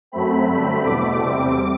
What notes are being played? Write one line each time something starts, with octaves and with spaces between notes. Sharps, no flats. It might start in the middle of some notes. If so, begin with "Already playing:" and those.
F#2 F#3 A3 C4 B5
G2 D3 A3 C4 B5
E2 B2 A3 D6
E2 C3 G3 C4